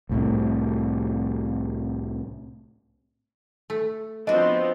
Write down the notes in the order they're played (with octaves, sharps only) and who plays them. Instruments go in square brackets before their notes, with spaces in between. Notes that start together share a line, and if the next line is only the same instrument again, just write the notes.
[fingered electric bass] C2 A2 C3
[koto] A3
[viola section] F3 B3 C4 [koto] D4 F#4 [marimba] D#5